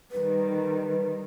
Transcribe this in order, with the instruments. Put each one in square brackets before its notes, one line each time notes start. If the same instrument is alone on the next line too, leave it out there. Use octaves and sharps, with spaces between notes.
[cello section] D#3 G3 [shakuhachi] B4